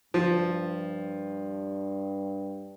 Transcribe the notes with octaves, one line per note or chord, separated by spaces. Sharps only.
G2 F3